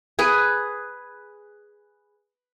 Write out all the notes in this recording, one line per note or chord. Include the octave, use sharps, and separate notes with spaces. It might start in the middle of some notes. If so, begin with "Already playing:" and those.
G#4 B4 G#5